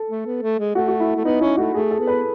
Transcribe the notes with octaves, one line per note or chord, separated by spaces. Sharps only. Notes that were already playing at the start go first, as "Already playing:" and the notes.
Already playing: A4
A3
B3
A3
G#3
A3 F#4
F#4
E4
A3
B3 D#4
C#4 E4
A3 F#4
A3 G#4
A4
B3
B4